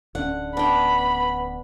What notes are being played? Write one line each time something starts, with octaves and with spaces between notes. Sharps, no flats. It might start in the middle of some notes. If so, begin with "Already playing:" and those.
D1 D3 C#4 F#5
B3 D4 G5 B5